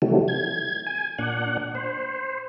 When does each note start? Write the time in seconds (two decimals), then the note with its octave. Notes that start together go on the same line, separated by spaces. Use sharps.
0.02 C3 D#3 E3 F#3 G3 A3
0.28 G#6
0.87 G#5
1.18 A#2 D4 F#5
1.75 C5